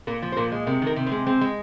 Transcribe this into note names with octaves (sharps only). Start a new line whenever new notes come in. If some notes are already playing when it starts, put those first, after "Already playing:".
A#2 A#4
F3
C5
A#2 A#4
G#3
C3 A#4
D#3 A#4
C3
C4
G#3
G#3 C4
G#3